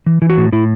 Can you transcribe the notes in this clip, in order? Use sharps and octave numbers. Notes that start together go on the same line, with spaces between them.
E3
E3 E4
F#4
A2
A2 E4